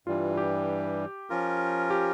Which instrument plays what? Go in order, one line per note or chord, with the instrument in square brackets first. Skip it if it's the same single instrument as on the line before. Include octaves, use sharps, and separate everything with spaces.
[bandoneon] G2 E3 G3 [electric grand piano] F4
[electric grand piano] G4
[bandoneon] F3 C#4 F4 A#4
[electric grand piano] G4